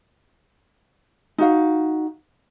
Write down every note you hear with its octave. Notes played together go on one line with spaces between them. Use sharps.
D#4 F#4 F5